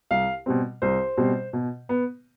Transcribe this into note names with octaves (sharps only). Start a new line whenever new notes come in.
C2 F5
B2 G3 C4
C2 C5
B2 G3 C4
B2
B3